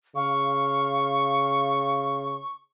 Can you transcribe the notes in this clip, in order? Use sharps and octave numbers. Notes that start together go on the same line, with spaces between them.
C#3 F5 C#6